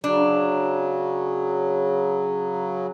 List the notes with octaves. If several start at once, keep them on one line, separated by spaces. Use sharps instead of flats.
C#3 F#3 D4